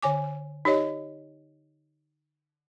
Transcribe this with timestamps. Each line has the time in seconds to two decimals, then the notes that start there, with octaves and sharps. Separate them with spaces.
0.03 D3 C#5 G#5 D6
0.65 D#4 G4 C#5 D#5